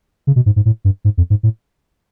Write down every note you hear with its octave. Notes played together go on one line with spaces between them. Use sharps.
C#3
B2
G#2
G#2
A2
G2
G#2
F2
G#2
A2